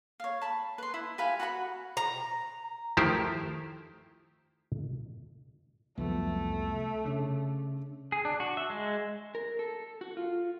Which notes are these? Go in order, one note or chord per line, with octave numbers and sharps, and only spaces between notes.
C#5 F5
A5 B5
B4 C6
E4
G4 B4 F5 G#5
F#4 F#5 A5 B5
A#5
D#3 F3 A3 E4 G4 C5
C2 F2 F3 F#3 A3 B3
C#3 D4
G#4
D4
F#4
E5
G#3
A#4
A4
F#4
F4